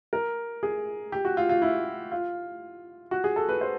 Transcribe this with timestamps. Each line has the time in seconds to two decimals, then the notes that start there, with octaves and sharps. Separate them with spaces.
0.13 A#4
0.63 G#4
1.12 G4
1.25 F#4
1.37 F4
1.49 F4
1.62 E4
2.12 F4
3.11 F#4
3.24 G#4
3.36 A4
3.49 B4
3.61 C5